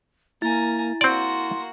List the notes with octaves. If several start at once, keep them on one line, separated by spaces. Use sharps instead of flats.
A#3 E4 G#5 A#5 A6
A#3 C4 F#4 D5 C6